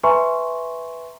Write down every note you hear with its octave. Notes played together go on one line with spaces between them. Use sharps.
B4 E5 G#5 A#5 C6 C#6